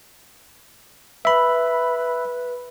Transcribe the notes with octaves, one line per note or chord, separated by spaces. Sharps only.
B4 E5 B5